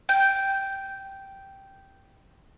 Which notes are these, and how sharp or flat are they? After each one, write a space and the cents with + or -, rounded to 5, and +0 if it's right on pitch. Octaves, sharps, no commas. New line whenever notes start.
G5 -5